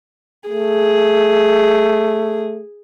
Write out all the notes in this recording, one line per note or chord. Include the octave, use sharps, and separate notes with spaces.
A3 G#4